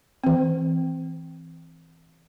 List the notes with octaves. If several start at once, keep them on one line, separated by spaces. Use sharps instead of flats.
E3 C4